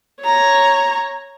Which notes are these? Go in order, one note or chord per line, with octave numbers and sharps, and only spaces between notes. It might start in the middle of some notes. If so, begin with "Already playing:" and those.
C#5 A#5